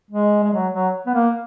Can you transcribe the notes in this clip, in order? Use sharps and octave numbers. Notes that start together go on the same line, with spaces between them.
G#3
G#3
F#3
F#3
B3
A#3